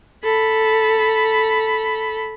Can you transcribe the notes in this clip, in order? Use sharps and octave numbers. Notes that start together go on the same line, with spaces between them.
A4 B5